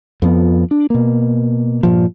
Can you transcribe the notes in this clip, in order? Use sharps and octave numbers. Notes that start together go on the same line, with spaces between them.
F2 F3 B3
D4
B2 A#3
G2 A#2 F3